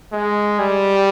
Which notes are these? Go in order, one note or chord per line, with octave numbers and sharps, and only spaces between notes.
G#3
G3